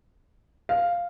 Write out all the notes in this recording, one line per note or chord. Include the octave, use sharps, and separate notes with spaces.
F5